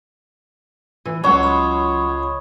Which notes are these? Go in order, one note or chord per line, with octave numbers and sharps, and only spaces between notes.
E3
C#2 F#3 C#5 F#5
B5 D#6